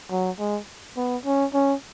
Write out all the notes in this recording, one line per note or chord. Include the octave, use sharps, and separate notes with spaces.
F#3
G#3
B3
C#4
C#4